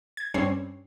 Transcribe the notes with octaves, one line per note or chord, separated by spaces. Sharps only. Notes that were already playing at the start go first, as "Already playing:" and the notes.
G#6
G2 G3 C4 C#4 C7